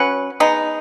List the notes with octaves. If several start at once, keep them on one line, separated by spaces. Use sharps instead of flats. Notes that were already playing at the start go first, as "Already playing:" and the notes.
Already playing: F#3 C#4 F#4 B4
G#3 B3 D#4